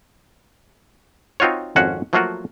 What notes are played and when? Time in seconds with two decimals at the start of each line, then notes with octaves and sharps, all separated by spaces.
1.40 C4 D#4 F4 F#4 C#5
1.76 G#1 F2 C#4 F#4 F5 F#5
2.13 F3 F#3 A3 A#3 F4 F#4